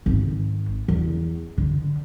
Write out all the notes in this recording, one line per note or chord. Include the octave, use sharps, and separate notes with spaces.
G#1
E2
D3